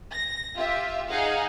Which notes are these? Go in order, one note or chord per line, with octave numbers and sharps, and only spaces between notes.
A#6
F4 G4 E5
D#4 G#4 D#5 F5 F#5